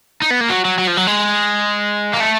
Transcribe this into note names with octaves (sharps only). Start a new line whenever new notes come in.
D#4
B3
A#3
F#3
F#3
F#3
F3
F#3
G#3
A#3
A3